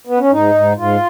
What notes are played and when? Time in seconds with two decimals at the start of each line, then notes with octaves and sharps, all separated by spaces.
0.07 B3
0.19 C#4
0.31 G#2 D#4
0.54 G#2
0.77 G#2 F4